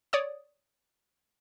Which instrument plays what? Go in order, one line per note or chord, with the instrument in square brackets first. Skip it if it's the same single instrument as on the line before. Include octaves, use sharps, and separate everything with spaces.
[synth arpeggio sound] C#5 D5 D#6